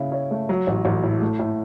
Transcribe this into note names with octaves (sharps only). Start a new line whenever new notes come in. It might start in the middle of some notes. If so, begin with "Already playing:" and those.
Already playing: C#3 E4
C#5
A3
F#3
A1
A1
A2
A3
A2